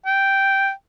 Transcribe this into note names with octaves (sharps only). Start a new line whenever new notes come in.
G5